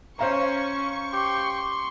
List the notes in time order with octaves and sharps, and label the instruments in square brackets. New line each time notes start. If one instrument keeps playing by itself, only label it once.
[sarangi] C#4 [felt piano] C5 F5 A#5 [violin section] C#6
[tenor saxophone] G4 [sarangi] C6